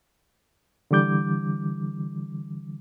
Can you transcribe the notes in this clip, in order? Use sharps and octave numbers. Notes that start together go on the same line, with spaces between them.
D3 E3 G3 D6 G6